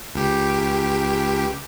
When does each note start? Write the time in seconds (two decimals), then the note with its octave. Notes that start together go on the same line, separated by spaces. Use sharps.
0.15 C#2 G4